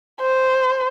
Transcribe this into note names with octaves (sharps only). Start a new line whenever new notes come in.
C5